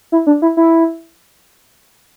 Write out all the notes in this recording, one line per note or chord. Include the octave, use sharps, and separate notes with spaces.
E4
D4
E4
E4